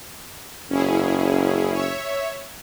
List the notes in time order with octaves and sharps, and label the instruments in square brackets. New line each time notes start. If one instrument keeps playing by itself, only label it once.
[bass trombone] F#1 [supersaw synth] C#4 E4 G#4
[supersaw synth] C#5 E5